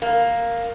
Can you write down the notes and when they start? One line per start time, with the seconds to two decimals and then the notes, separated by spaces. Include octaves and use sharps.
0.02 A#3